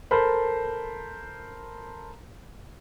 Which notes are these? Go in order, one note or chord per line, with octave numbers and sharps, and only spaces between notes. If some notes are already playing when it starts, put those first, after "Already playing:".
A4 A#4 C5 B5